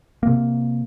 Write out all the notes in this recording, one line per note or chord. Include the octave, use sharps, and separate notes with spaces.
C3 A#3